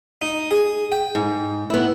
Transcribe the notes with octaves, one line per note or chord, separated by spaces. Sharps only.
D#4
G#4
G5
G#2
B3 E4